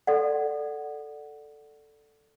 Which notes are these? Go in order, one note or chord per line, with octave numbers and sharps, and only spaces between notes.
A4 D5 F#5